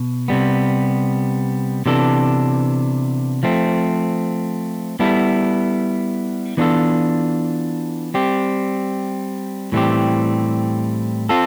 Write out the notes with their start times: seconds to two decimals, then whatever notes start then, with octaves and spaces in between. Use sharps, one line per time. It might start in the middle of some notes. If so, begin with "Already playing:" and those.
Already playing: B2
0.28 C3 G3 B3
1.86 C3 E3 B3 D4 A4
3.43 F3 A3 C4
5.00 G3 B3 E4 A4
6.57 E3 B3 D4 F4 A4
8.14 G3 C4 G4
9.72 A2 E3 G3 C4 G4
11.29 C4 F4 A4